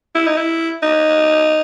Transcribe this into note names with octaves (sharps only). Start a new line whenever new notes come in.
E4
D#4
E4
D#4